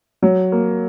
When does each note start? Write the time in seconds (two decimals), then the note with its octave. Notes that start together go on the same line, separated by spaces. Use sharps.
0.22 F#3
0.52 A#3